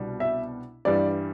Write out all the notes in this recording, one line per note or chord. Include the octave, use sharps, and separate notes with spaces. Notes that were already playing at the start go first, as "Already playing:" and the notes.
Already playing: C2 B2 G3 D4
E5
G2 E3 G3 D5